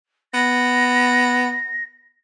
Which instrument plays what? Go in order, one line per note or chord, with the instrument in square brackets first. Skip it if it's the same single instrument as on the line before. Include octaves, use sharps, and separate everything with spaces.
[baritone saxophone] B3 [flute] A#6